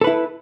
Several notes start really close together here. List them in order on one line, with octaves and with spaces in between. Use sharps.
A4 B4 E4